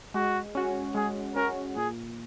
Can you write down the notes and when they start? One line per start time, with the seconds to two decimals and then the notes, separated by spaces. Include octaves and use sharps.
0.14 G#3 F#4
0.55 C#4 F#4
0.95 G#3 G#4
1.36 C#4 F#4 A#4
1.76 A#2 G#4